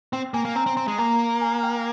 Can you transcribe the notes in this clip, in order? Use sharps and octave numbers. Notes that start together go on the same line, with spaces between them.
C4 G5
A#3 G#5
A#3
C4 A#5
C4
C4
G#3
A#3 A#5
G#5
G5